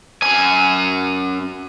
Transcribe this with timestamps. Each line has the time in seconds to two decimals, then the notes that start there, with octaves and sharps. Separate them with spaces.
0.22 F#2 G#5